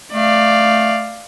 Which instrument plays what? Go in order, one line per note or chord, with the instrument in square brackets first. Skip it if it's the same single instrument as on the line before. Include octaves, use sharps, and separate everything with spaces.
[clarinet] A3 [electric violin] D5 F5